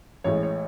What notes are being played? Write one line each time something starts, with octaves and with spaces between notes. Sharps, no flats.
A1 A2 G#3 C#5
C#5